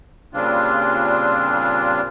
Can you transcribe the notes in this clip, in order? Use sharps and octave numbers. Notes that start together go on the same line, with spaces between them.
A#2 C#3 G3 C4 D4 F4